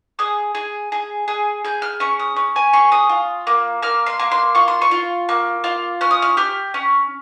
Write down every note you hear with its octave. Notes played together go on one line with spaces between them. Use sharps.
G#4 D#6
G#4
G#4
G#4
G#4 G6
F6
C#4 C#6
D#6
C#4
G#5
G#4 C#6
D#6
F4
A#3
A#3 F6
C6
A#3
C6
F4 C#6
C6
C#6
F4
A#3
F4
C#4 F6
D#6
F6
G4 F6
C#4